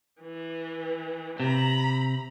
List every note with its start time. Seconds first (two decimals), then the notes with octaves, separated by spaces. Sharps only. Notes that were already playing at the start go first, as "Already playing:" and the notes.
0.22 E3
1.40 C3 A#5 B5